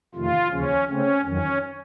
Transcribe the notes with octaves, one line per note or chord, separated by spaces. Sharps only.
F2 C3 D#3 A3 F4
D#2 C#3 F3 C#4
C#3 A3 C4 C#4
F2 D#3 F#3 C#4